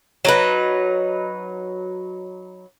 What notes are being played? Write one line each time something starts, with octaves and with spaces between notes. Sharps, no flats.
F#3 D#4 B4